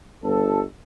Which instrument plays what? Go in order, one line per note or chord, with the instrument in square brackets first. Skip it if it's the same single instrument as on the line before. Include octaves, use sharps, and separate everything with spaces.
[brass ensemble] G1 A4